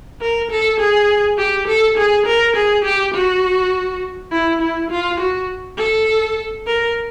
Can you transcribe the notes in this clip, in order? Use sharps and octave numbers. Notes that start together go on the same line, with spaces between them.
A#4
A4
G#4
G4
A4
G#4
A#4
G#4
G4
F#4
E4
E4
F4
F#4
A4
A#4